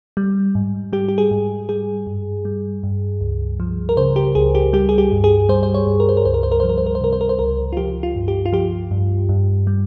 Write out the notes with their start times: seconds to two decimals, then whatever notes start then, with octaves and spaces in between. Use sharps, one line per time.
0.17 G3
0.55 G#2
0.93 G3 G4
1.08 G4
1.18 G#4
1.31 G#2
1.69 G3 G#4
2.07 G2
2.45 G3
2.83 G2
3.21 C#2
3.60 F3
3.89 A#4
3.97 C#3 C5
4.16 G4
4.35 C#2 G#4
4.55 G4
4.73 G3 G4
4.89 G#4
4.98 G4
5.12 G2
5.24 G#4
5.49 G3 C5
5.63 C5
5.74 C#5
5.87 G2
6.00 A#4
6.09 C5
6.17 A#4
6.25 C#2 C5
6.34 A#4
6.43 C5
6.52 A#4
6.60 F3 C5
6.69 A#4
6.78 C5
6.86 A#4
6.95 C5
7.01 C3 A#4
7.13 C5
7.21 A#4
7.29 C5
7.39 C#2 A#4
7.73 F4
7.77 F3 G4
8.03 F4
8.16 G2
8.28 G4
8.46 F4
8.53 F3 G4
8.91 G2
9.29 G2
9.67 G3